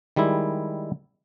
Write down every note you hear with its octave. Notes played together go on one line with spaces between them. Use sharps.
D#3 G3 G#3 E4